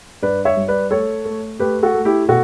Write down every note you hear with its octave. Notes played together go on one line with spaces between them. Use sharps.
G2 B4 D5
C#5 E5
G3
B4 D5
A3 A4 C#5
A3
A3 G4 B4
F#4 A4
A3
E4 G4
B2 F#4 A4